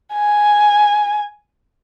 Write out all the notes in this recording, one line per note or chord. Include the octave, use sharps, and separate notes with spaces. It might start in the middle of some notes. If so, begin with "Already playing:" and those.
G#5